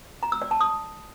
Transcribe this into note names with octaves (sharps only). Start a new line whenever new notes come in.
A#5
E6
D5
A5
D#6